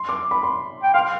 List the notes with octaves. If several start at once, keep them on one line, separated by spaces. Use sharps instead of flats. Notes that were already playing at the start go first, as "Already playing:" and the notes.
Already playing: C6
D6
B5
C6
G5
F5 C6